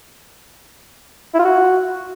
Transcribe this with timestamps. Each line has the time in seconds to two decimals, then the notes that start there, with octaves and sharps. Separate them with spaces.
1.34 E4
1.40 F4
1.45 F#4